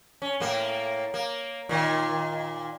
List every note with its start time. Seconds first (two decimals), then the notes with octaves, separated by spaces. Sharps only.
0.22 C#4
0.40 A2 A#3
1.14 A#3
1.69 A#2 D#3